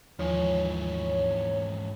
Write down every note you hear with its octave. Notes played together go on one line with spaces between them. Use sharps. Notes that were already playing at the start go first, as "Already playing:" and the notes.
D#2 G#2 E3 F3 D#4 C#5 G#5